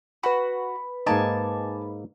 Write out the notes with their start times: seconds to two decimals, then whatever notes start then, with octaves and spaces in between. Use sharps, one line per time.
0.23 F#4 B4 B5
1.06 G#2 A#3 D#4 G#5 A5 D6